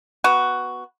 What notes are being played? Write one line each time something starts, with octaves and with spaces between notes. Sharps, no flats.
B3 F#4